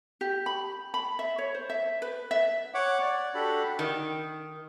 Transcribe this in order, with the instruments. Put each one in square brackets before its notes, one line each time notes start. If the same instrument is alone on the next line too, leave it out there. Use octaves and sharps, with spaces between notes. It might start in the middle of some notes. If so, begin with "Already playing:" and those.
[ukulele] G4
B5
B5
E5
C#5
C5
E5
B4
E5
[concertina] C#5 F#5 D6
D5
D4 F#4 G4 A4 B5
[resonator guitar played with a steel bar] D#3